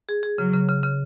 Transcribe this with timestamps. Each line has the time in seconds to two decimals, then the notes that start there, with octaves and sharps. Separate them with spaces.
0.09 G#4
0.23 G#4
0.38 C#3 F#3
0.53 C#3
0.69 C#3
0.83 C#3